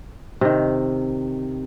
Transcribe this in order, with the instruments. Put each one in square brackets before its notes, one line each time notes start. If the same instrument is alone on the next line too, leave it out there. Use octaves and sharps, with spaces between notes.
[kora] C3 D#3